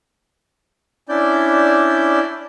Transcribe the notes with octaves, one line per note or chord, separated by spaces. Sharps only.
C#4 D4 E4 D5 G6